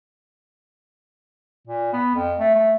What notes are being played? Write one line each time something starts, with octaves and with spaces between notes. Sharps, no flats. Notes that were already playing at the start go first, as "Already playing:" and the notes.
A#2
B3
F2
A3
A3